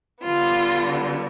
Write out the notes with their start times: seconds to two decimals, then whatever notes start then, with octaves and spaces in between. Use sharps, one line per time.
0.24 D3 G3 B3 F4